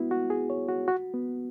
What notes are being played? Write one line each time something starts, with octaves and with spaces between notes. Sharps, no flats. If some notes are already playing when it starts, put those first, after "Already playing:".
Already playing: B3 E4 F#4
F#4
G#4
C#5
F#4
F#4
B3